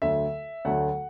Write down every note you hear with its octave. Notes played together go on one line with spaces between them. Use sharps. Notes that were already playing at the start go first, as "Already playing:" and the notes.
D2 D3 F#3 A3 E5
D2 D3 F#3 A3 F#5